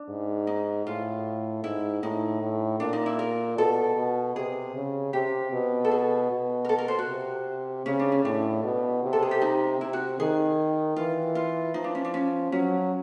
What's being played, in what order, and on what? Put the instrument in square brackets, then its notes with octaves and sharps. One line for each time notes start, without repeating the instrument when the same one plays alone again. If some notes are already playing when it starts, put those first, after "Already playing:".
Already playing: [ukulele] D4
[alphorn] G#2
[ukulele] D#4
[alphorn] A2 [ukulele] F4
[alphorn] G#2 [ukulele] E4
[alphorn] A2 [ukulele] D#4
[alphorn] A2
[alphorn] A#2 [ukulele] D4
[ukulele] D#4
E4
A#4
[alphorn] B2 [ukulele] A4
[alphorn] B2
[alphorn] C3 [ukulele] G#4
[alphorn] C#3
[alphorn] C3 [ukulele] G4
[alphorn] B2
[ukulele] A4
G#4
[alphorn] B2
[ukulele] A#4
A4
A#4
C5
F#4
[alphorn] C3
[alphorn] C#3 [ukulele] C#4
[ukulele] D4
C#4
[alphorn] A2 [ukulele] D4
[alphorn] B2
C3
[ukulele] A4
G#4
G4
D#4
[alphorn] C3 [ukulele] E4
[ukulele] F#4
[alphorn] D#3 [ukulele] G#4
[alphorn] E3 [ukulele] F4
[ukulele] F4
[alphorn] F3 [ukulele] D#4
[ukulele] D4
C#4
D4
C#4
[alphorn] F#3 [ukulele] C#4